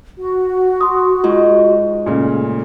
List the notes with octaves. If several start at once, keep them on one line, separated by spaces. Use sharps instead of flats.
F#4
C6 D#6
G#2 F4
A#2 C#3 A3